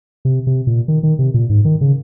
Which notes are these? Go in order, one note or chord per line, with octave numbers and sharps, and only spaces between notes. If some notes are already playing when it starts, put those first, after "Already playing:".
C3
C3
A#2
D#3
D#3
C3
A#2
G#2
D#3
C#3